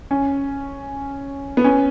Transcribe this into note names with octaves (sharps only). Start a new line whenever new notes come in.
C#4
B3
C#4